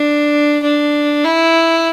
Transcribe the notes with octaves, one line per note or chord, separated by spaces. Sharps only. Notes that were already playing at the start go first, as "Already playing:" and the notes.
Already playing: D4
D4
E4